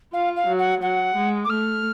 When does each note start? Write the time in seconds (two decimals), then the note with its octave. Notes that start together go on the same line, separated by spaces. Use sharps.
0.13 F4 F5
0.36 F5
0.47 F#3
0.59 F#5
0.81 F#3 F#5
1.16 G#3
1.45 D6
1.50 A3 F6